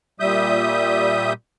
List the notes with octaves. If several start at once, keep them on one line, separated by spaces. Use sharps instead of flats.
A#2 G3 E5 D#6 G6